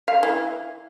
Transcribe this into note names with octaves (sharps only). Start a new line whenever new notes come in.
F5
E3